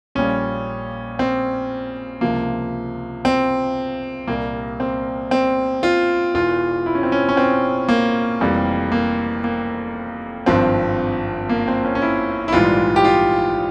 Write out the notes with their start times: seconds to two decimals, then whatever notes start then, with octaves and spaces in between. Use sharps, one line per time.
0.15 A#1 A#2 G3 C#4
1.19 C4
2.21 C#2 C3 F3 A#3
3.25 C4
4.27 C2 A#2 G3 A#3
4.80 C4
5.31 C4
5.83 F4
6.34 E1 E2 E3 F4
6.86 E4
6.95 C#4
7.03 C4
7.12 C#4
7.29 C#4
7.37 C4
7.88 A#3
8.41 F1 F2 E3 G3
8.92 A#3
9.44 A#3
10.46 G#1 G2 F3 C4
11.49 A#3
11.68 C4
11.85 C#4
11.95 C#4
12.02 E4
12.48 E4
12.52 A#1 G#2 E3 G3 F4
12.96 G4
13.05 F4